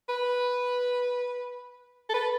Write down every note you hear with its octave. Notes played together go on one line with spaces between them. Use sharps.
B4
A4
B4